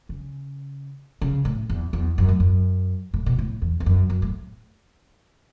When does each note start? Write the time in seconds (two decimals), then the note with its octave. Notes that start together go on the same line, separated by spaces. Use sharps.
0.09 C#3
1.22 C#3
1.45 A2
1.70 E2
1.93 E2
2.18 F#2
2.29 A2
2.40 F#2
3.14 A2
3.26 B2
3.38 A2
3.62 E2
3.80 E2
3.86 F#2
4.10 F#2
4.22 A2